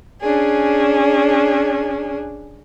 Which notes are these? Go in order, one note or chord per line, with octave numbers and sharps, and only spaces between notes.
C#4 D4 G#4